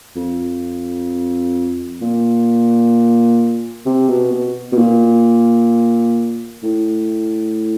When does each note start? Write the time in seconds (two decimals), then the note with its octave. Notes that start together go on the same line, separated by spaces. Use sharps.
0.16 F2
2.02 A#2
3.86 C3
4.09 B2
4.32 B2
4.72 B2
4.78 A#2
6.63 A2